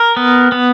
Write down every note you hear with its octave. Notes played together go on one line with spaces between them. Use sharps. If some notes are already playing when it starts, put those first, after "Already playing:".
Already playing: A#4
B3
B3